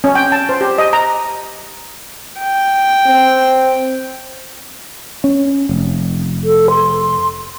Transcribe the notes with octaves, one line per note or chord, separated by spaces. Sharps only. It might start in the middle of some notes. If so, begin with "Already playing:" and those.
C#4
G5
A5
C5
G4
D#5
A#5
G5
C4
C#4
F1
A4
C6